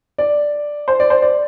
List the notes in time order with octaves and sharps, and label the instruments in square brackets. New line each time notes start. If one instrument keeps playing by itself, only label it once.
[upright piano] D5
C5
D5
C5
D5